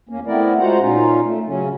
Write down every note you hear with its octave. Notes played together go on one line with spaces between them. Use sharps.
E2 A#3 C#4
A3 B3 C4 E4 A#4 D5
G#3 F4 F#4 C5 F#5 A#5
A#2 C#4 D#4 F4
A3
C#3 F#3 C#4